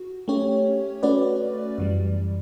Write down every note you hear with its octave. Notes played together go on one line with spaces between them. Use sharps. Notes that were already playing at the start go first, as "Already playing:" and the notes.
Already playing: F#4
A3 C#4 G4 C#5
A3 C#4 F#4 B4 D5
F#2 E3 G3